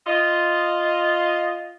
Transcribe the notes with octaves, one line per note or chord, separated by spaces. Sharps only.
F4 D#5